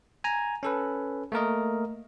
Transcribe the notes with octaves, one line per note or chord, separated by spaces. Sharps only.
G#5 A#5
C#4 A4 B4
A3 A#3 A#4 D#5